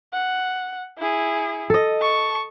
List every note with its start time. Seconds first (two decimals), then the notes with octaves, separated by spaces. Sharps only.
0.13 F#5
0.98 E4 G#4
1.70 A4 D#5
2.00 A5 C#6